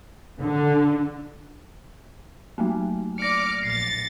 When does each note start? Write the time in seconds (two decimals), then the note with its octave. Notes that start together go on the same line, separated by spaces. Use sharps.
0.41 D3
2.58 F#3 A3 A#3
3.18 D5 D6 F6 A#6 C#7
3.63 A#1 A6 C7